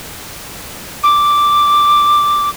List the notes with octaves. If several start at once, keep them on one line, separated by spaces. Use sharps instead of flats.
D6